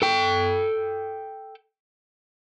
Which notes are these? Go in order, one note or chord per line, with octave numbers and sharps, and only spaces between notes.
A4 G5